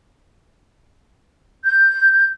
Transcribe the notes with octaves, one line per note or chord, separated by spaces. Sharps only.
G6